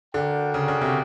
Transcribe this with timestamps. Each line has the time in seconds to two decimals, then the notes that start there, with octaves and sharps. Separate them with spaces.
0.14 D3 F#4 A#4 D5 G5
0.54 C#3
0.68 C#3
0.81 C3